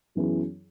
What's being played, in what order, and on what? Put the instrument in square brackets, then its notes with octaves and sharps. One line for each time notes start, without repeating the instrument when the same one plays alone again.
[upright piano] F#2 E3 B3 E4 G#4